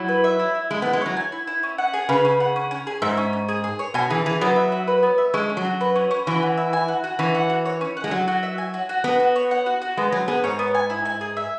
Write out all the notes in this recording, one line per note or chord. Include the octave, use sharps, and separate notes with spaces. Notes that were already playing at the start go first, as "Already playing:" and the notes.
Already playing: F#3 E4
B4
E5
E4
E4
G#3 E4
B3
E4
G#3
F#3 C#5
G#5
E4
E4
C#4
F#5
G#4
C#3 B4
C#4
F#5
C#4
C#4
G#4
G#2 E5
C#4
C#4
G#4
G#4
C#5
B2 G#5
E3 G#4
E3 G#4
F#3 B3
E5
F#4
B4
B3
E5
G#3 C#4
C#4
F#3
F#4
B4
C#4
C#4
E3 F#4
F#4
E5
G#5
F#4
F#4
E3 C#4
F#5
F#4
C#5
C#4
F#5
G#3
F#3 F#4
F#4
E5
G#5
F#4
F#4
B3 F#4
F#4
C#5
F#5
F#4
F#4
G#3 B3
F#3 G#5
B3 G#4
G#2 C#5
B3
G#5
E4
G#5
G#4
E5